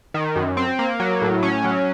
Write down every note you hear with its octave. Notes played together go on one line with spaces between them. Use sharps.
D#3
F#2
C4
A#3
F#3
A2
C#4
F#3